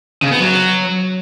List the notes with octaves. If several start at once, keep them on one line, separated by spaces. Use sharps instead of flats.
C#3
B3
F#3